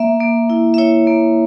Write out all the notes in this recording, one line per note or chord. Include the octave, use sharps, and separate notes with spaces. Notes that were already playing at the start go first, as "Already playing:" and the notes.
Already playing: A#3 E5
A#3
E4
E5
E4 C#5
A#3